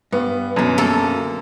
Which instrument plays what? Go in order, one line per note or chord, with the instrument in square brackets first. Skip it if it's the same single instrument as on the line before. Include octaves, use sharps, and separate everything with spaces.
[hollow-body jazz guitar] G2 [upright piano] B3
[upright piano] F#2 [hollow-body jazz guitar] B2 D3
[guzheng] A#3 A4